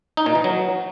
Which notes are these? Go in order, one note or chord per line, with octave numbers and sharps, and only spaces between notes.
D#4
A#2
E3
F#3